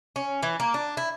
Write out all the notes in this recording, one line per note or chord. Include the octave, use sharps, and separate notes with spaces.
C#4
E3
A#3
D4
E4